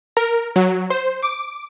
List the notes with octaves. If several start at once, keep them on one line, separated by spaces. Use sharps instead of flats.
A#4
F#3
C5
D6